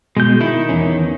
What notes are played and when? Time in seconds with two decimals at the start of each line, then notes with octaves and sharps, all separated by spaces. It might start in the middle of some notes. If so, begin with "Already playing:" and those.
0.17 B2 G#3 G6
0.41 D#3 E4
0.69 E2 C#4